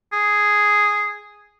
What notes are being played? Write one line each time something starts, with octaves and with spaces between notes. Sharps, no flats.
G#4